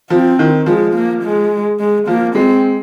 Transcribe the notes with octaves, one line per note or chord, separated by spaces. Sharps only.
F3 C4
D#3
F3 G#3
A#3
G#3
G#3
F3 A#3
G#3 C4